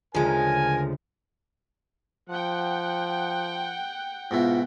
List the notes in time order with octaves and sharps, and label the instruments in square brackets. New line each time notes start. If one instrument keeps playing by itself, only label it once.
[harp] D2 C#3 [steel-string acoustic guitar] F3 G#3 [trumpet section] A#4 G#5
[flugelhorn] F3 [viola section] F#5 G5
[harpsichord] G#2 B2 E4 [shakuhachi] F4